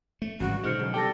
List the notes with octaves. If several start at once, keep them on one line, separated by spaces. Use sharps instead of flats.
A3
G#1 C#3 E3 G3 F#4
B2 D3 G#3 D#4 C5 F6 C#7
F#2 C#3
C3 G3 A4 G5 D6 A#6